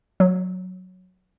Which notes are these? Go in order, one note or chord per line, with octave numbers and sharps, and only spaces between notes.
F#3